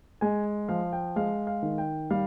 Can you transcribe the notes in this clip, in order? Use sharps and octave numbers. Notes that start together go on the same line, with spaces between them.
G#3 G#5
F3 F5
G5
G#3 F5
F5
D#3
G5
G3 F5